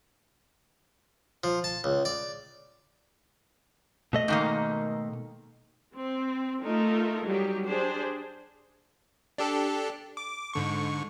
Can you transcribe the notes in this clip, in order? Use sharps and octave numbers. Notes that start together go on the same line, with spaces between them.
F3
A5
C#2
D5
B2 A3 D#5
G#2 D#3 A#3
C4
A3 D#4 F4 A4 A#4
F#3 G3 D#4 G4
D4 G4 G#4 C5
D4 G4 A4
D6
G#2 D3 C#6